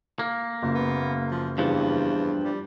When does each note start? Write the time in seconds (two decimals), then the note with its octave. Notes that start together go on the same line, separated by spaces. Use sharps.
0.19 A#3
0.62 F#1 A#2
0.75 B3
1.31 F3
1.58 E2 G2 F3
2.43 G3